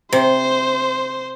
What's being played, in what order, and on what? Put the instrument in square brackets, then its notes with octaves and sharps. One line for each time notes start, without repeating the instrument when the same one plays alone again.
[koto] C3 [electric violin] C5